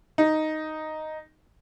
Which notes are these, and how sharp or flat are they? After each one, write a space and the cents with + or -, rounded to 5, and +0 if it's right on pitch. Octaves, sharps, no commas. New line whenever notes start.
D#4 +0